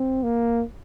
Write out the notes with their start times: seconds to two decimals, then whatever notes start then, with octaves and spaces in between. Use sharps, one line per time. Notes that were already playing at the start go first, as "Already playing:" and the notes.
Already playing: C4
0.23 A#3